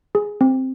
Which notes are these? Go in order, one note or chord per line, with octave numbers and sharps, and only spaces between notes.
G#4
C4